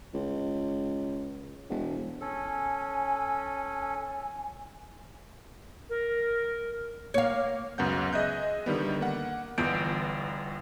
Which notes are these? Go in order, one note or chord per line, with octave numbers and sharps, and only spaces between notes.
C#2
E1
C#4 A4 G#5
A#4
A#3 C#5 F5
C#2 F#2 B3 F#5 G6
G#4 D#5 E5 F#6 G6
D3 D#3 G3 B3
A#3 F#5
G1 E2 B3 F4 G6 D7